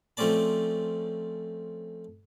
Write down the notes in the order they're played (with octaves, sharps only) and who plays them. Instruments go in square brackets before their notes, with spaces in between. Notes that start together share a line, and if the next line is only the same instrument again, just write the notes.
[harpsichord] F3 A3 C4 C#4 D5 A5